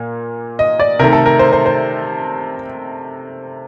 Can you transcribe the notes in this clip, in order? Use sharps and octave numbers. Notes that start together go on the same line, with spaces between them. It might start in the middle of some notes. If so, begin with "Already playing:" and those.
Already playing: A#2 A#3
D#5
D5
C3 D#3 A3 A#4
A4
A#4
C5
C5
C5